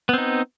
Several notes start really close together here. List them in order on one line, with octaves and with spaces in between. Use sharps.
B3 C4 D#4